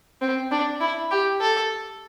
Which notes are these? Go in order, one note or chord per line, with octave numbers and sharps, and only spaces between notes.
C4
D4
E4
G4
A4